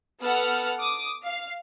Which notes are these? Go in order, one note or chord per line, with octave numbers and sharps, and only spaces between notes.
B3 A4 F#5 F6
D6 D#6
F5